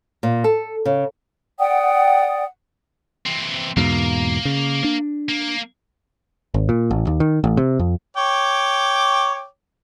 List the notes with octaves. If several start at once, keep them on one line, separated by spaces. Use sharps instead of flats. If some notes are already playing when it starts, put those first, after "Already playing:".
A#2
A4
C#3
D5 F#5 G5 D#6
E3 C4
E2 G#2 B2 A#3
C#3
D4
A#3
G#1
A#2
A1
D#2
D#3
A1
C3
F2
C#5 G5 D6